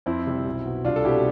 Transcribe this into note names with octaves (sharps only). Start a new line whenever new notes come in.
F2 C4 E4
C3 G3 C4
B1
B2 B3
C2 D4 F4
A4
B2 G3 C4 E4 G4